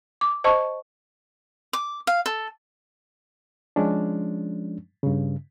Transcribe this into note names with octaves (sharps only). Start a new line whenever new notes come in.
D6
C5 D#5 A5 C#6
D6
F5
A4
F3 G#3 C#4 D4
G2 C#3